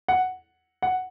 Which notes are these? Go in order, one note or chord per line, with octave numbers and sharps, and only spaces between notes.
F#5
F#5